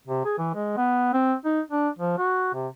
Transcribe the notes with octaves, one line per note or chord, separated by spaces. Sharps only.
C3
G#4
E3
G#3
B3
C4
D#4
D4
F3
F#4
C3